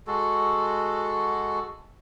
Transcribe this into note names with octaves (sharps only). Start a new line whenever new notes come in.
G#3 F#4 A4